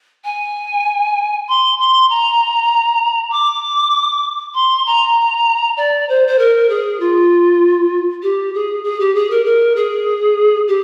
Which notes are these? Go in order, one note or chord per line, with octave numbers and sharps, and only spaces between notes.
G#5
C6
C6
A#5
D6
C6
A#5
D5
C5
C5
A#4
G#4
F4
G4
G#4
G#4
G4
G#4
A#4
A#4
G#4
G4